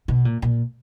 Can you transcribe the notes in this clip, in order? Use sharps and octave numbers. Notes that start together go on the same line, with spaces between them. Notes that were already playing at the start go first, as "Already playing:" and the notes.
B2
A#2
A#2